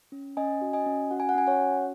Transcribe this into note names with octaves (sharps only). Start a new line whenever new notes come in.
C#4
C#4 D#5 G#5
F#4
D#5 G#5
C#4
F#4 F#5
G#5
F#5
C#4 G#5
C#5 F#5
F#4